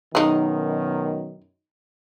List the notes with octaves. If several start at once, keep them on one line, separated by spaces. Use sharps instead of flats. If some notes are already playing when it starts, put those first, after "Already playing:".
F#2 B2 D#3 D#4 G#4